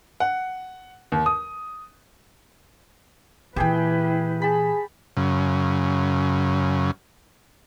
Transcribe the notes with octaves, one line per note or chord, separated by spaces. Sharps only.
F#5
D#2
D#6
A#2 E3 E4 G4 G#4 B4 G5
G#4 A5 B5
F#2 C#3